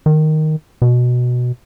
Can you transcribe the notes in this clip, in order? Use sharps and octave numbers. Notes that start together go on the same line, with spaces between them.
D#3
B2